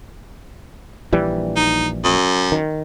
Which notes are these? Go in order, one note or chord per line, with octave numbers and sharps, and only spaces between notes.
A#1 E3 G3
D#4
F#2
D#3